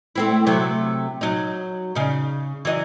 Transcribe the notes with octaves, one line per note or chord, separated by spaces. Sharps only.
A3 C4 E4
C3 F#3 A3
F#3 D#4
C#3 D#4
E3 F#3 D#5